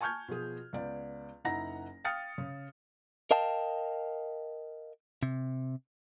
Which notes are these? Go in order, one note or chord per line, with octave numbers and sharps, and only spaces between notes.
G#5 A5 C#6 F6 G6 G#6
B2 F3 G#4
C#2 B3 D5
F#1 D#4 E4 F#5 A#5 A#6
F5 G5 D#6 F6 A6 C#7
C#3
A#4 D#5 F5 G5 A5
C3